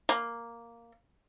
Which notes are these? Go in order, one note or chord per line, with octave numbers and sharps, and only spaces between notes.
A#3